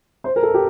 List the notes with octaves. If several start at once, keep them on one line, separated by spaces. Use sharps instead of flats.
C5
A#4
A4
G4